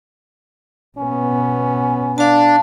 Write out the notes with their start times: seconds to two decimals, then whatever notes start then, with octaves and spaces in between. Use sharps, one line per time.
0.98 B2 B3 C#4
2.18 D4 F5 A5